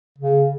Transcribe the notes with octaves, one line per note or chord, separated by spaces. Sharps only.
C#3